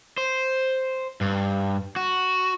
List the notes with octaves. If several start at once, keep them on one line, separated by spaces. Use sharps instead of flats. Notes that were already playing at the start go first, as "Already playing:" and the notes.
C5
G2
F#4